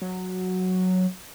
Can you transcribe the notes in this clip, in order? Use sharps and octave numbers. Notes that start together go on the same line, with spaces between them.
F#3